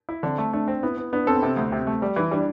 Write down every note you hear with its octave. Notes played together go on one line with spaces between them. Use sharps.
E4
D3 C4
A3
A3 D4
C4
B3 E4
B3
B3 D4
C4 A4
B3
C3 C4
D2
C3
A3
G3
E3 E4
G3 D4